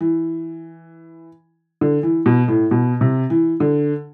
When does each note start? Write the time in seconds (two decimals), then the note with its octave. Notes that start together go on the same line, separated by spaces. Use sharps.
0.01 E3
1.81 D3
2.03 E3
2.26 B2
2.48 A2
2.71 B2
3.01 C3
3.30 E3
3.60 D3